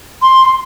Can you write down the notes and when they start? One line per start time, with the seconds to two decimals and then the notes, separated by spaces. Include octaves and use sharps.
0.22 C6